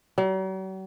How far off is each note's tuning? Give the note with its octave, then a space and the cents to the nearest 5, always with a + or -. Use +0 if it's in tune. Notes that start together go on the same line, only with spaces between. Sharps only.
F#3 +45